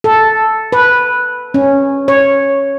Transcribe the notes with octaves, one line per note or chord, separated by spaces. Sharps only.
A4
B4
C#4
C#5